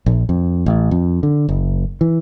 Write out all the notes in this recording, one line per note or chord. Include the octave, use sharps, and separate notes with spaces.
A#1
F2
A1
F2
D3
F#1
E3